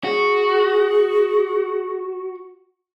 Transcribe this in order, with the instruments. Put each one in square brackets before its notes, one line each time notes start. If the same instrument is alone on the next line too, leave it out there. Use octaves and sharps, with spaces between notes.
[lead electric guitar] F#4 [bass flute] G#4